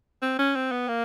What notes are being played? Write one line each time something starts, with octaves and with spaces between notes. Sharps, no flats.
C4
C#4
C4
B3
A#3